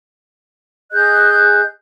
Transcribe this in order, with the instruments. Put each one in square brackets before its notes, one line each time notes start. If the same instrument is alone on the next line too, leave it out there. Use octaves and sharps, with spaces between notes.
[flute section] G#4 D#5 F#6 G6